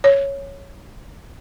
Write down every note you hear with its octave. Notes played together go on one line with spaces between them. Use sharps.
C#5